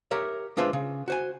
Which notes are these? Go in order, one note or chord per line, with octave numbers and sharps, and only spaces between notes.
G4 A#4 C#5 E5
G#3 D4 F4 B4 C5 E5
C#3
F#4 C5 G#5